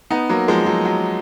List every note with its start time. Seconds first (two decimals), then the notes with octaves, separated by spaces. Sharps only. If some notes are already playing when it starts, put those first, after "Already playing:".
0.11 B3 D#4
0.29 F#3 A#3
0.48 F3 G#3
0.66 F#3
0.85 F#3